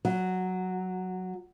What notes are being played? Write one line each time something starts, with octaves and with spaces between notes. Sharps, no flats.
F#3